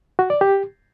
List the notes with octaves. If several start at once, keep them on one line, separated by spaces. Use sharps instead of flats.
F#4
D5
G4